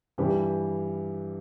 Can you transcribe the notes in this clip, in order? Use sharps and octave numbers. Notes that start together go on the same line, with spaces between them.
G2 E3 G3 G4